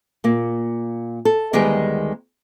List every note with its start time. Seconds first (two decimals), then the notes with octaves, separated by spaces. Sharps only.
0.24 A#2 A#3
1.25 A4
1.53 D2 D#3 G3 G#3 B3 G#4